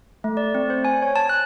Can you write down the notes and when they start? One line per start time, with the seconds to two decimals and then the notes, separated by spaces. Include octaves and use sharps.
0.24 A3
0.37 D5
0.55 C4
0.70 C5
0.85 G#5
1.02 C#5
1.16 A5
1.29 F#6